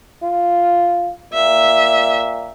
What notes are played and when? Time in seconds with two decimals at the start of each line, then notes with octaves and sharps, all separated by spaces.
0.24 F4
1.33 A#2 E5